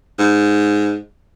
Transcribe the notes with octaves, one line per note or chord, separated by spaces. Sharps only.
G#2